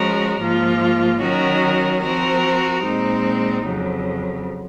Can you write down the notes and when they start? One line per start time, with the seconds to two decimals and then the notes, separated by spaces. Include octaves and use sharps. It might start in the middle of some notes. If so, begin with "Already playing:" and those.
Already playing: F3 G#3 C#4 F#4 A#4
0.39 G#2 F3 A#3 F4
1.20 D#3 F#3 C#4 F#4 A#4
2.02 F3 C4 F#4 A#4
2.83 A#2 G#3 C4 D#4
3.63 F2 C#3 F#3